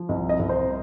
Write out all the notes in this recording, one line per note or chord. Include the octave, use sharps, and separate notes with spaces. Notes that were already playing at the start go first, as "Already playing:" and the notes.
Already playing: F3
C2 D#5
D#5
C2
C5